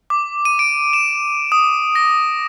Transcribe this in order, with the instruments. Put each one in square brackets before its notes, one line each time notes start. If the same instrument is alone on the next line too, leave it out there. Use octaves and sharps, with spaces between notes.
[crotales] D6
D#7
D7
E7
D#6
A#6